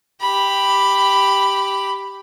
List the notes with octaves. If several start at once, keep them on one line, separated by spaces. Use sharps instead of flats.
G4 B5